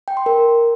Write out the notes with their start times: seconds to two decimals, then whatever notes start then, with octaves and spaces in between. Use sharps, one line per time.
0.08 G5
0.17 C6
0.26 A#4